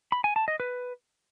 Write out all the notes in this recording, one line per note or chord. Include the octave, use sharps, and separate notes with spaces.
B5
G#5
A5
D#5
B4